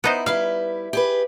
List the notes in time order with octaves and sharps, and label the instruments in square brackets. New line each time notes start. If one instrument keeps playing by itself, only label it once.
[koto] B3 D#4 C5 [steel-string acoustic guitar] E4
[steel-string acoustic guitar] G3 E4 B4 [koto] F5
[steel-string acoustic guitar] G4 G#4 B4